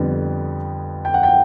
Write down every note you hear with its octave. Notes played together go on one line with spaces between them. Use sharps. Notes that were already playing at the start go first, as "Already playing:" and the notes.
Already playing: F2 D3 G3 B3
G5
F#5
G5